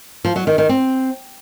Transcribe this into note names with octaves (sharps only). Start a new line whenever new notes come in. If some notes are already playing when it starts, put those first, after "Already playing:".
F3
F#3
D#3
D#3
C4